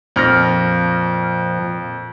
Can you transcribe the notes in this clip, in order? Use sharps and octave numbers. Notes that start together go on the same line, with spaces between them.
F2 A#2 F3 F6 A#6